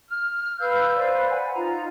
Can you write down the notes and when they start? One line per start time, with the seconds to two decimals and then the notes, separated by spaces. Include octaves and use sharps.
0.09 F6
0.59 B4 F5 E6 G6
0.96 B4 C5 D5 F5
1.30 F#5 G#5
1.53 D#4 F4 A#5